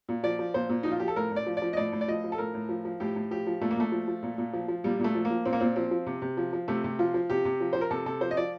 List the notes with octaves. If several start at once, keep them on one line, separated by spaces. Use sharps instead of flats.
A#2
F3 D5
F3
A#2 C5
A#2
F3 D#4
F4
F3 G4
A4
A2 A#4
A2
D5
F3
D5
F3
D#5
A2 D5
A2
D5
F3 D#5
F3
A4
A2 A#4
A2
F3
F3
A2 G4
A2
F3 G4
F3
A#2 A3
A#3
A#2 A3
F3
F3
A#2
A#2
F3
F3
A#2 G3
A#2 A3
F3
A#3
F3
A#2 C4
A#3
A#2 C4
F3 C4
F3
C3
C3
F3
F3
C3 A3
C3
F3 F4
F3
C3 G4
C3
F3
F3 C5
A#4
C3 A4
C3 A4
F3 C5
D#5
F3 D5